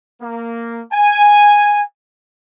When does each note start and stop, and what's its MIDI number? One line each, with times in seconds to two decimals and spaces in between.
0.21 0.81 58
0.93 1.82 80